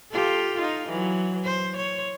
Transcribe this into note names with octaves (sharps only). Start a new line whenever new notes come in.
F4 G4 A4
D#4 F4
E3 F#3
C5
C#5